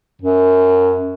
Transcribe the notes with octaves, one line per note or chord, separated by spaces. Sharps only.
F#2